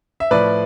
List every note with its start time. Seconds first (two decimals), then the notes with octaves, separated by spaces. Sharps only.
0.20 E5
0.31 A2 F3 B4 D5